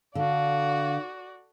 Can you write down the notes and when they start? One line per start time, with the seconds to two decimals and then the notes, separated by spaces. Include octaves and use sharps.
0.15 D3 F#4 D5 F5